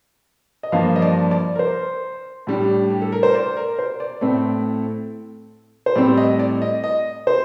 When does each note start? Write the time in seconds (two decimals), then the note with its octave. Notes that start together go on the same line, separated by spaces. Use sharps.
0.63 D#5
0.72 G2 F3 A#3 F5
0.96 D#5
1.02 D5
1.31 D5
1.55 A#4
1.59 C5
2.47 A2 G3 D4
2.90 G4
3.02 A4
3.12 A#4
3.23 C5
3.35 D5
3.57 A#4
3.79 C5
4.00 D5
4.21 A2 A3 C4
5.86 C5
5.96 A2 G3 C4 D5
6.17 D#5
6.39 D5
6.62 D#5
6.84 D#5
7.27 C5